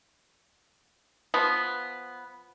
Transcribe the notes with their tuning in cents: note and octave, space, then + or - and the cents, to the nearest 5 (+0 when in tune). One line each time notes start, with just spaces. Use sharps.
F3 +0 B3 +0